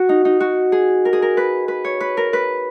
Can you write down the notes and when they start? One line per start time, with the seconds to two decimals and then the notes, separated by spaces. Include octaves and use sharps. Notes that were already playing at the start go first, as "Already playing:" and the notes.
Already playing: F#4
0.09 D#4
0.25 D#4
0.40 F#4
0.72 G#4
1.05 A#4
1.13 G#4
1.22 A#4
1.37 B4
1.68 B4
1.85 C#5
2.00 B4
2.17 A#4
2.33 B4